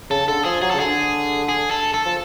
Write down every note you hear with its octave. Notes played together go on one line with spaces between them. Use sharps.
C#3 A4
D3 A4
F3 G#4
F#3 G#4
A4
C#3
D3 G#4
G#4
A4
A4
F3